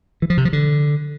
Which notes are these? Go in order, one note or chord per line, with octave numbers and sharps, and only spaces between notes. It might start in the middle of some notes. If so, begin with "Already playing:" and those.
E3
F3
C3
F3
D3